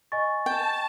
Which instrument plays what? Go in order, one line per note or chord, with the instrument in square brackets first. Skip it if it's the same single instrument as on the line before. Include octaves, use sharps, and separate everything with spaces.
[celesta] D#5 G#5 A6 [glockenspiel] C#6
[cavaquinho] G5 [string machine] A5